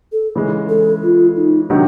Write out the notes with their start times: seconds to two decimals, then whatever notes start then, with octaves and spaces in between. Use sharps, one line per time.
0.12 A4
0.36 C#3 E3 G#3
0.69 A4
1.03 F4
1.36 D#4
1.70 C3 D#3 F#3 D4